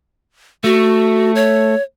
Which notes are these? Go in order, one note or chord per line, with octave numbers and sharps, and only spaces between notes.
A3 F#4
C#5